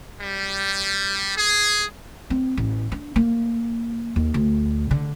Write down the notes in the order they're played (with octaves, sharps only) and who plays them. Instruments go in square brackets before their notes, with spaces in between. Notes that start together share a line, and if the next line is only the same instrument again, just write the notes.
[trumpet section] G3
G#4
[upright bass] C4
A1
D4
A#3
D#2
D2
D3